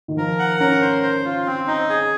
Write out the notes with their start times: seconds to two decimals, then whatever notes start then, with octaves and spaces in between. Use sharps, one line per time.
0.08 D#3
0.17 F3 A#4
0.39 F#5
0.60 C#4 A#4
0.82 C5
1.03 C5
1.25 F4
1.47 C4
1.67 D#4
1.90 G#4